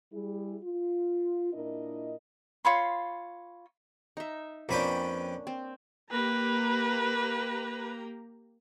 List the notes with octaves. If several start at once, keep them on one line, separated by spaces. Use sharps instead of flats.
G3 E4 G#4
F4
A#2 D4 E4 A#4 D#5
F4 C#5 B5 C6
D#4 E5
F2 A#3 C#4 D4 B4 G5
C4
A#3 G4 B4 A#5